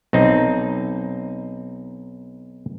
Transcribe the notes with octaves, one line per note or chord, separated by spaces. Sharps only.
B1 C4 D#4